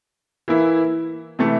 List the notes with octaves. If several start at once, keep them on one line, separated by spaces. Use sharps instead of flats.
E3 A#3 E4
C3 E3 A3